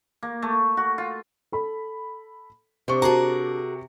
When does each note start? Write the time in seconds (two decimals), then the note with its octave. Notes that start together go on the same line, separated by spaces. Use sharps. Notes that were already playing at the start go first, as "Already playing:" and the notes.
0.23 A#3
0.42 A3
0.77 F#4
0.98 F4
1.52 A4 B5
2.88 C3 D4 C5 C#6
3.02 F#4 G#4 A#4 A5 A#5